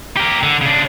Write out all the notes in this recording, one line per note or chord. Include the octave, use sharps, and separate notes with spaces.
G4 A#4
D3
C#3 D4